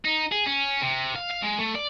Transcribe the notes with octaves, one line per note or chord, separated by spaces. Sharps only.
D#4
G#4
C#4
C3
F5
F5
G#3
A3
D5